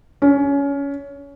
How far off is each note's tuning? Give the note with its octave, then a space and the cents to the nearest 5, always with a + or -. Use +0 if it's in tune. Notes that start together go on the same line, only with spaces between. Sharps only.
C#4 +20